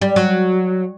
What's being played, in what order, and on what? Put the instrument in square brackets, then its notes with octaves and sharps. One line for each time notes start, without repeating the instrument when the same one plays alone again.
[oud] G3
F#3